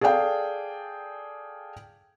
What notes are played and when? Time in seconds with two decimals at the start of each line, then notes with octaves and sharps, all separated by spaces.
0.01 G#4 A4 D5 F5 G5